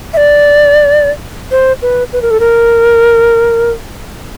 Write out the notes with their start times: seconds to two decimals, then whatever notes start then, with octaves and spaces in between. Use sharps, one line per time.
0.14 E5
0.17 D5
1.51 C5
1.82 B4
2.13 B4
2.22 A#4
2.31 A4
2.40 A#4